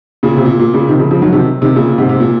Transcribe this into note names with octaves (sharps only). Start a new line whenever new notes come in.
A#2 C#3
C3
A#2
A#2
A#2 C#3
C3 D#3
C#3 F3
C#3 F3
D#3 F#3
C3 D#3
C3 D#3
A#2 C#3
G#2 C3
C3
A#2